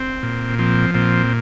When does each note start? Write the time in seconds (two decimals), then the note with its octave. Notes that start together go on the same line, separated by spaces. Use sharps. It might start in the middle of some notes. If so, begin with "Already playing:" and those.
Already playing: C4
0.23 A#2
0.59 F3 C4
0.94 A#2 C4